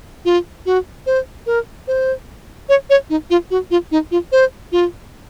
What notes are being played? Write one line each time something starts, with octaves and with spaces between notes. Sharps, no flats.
F4
F#4
C5
A#4
C5
C#5
C#5
D#4
F4
F#4
F4
D#4
F4
C5
F4